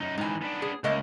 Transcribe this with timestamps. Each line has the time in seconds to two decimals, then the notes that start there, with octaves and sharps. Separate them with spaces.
0.01 F#2 D#4
0.18 G#2 E3 D#4 G#5
0.42 B3 D4
0.62 G#4
0.84 C#2 A3 A#3 D#5